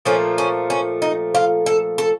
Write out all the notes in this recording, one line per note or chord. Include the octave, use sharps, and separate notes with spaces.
A#2 F3 A3 C#4
C#4
C#4
D#4
F4
A4
A4